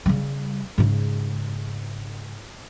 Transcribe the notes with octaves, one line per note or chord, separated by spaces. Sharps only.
C#3 G3
G#2 C#3